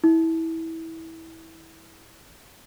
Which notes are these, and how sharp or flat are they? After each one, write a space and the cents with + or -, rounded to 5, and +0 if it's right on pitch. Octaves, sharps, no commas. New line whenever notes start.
E4 -20